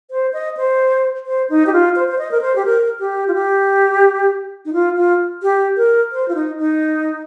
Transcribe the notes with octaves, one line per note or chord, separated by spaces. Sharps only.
C5
D#5
C5
C5
D#4
G4
F4
C5
C5
D#5
A#4
C5
G4
A#4
G4
F4
G4
D#4
F4
F4
G4
A#4
C5
F4
D#4
D#4